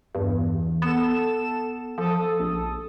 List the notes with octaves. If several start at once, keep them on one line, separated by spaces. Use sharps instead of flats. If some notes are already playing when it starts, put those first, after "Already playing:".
E2 G2
B3 A4 E7
F3 A4 D#6
A#1